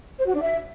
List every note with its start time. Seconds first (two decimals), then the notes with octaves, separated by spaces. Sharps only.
0.18 C5
0.26 F#4
0.34 D4
0.41 E5